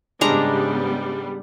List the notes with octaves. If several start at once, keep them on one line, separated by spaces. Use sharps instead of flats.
G#2 C#3 G3 G#3 B3 D4 A#5